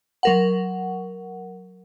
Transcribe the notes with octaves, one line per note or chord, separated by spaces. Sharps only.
F#3 A#4 F#5